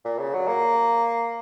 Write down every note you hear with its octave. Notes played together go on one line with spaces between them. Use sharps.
A#2
C#3
F#3
A#3